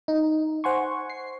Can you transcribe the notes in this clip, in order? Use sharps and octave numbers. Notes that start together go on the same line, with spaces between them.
D#4
C5 F#5 G#5 C6 C#6
C7